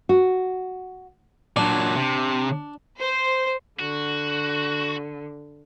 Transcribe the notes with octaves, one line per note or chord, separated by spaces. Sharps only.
F#4
A#2 F#3 D4
C3
C5
D3 F#4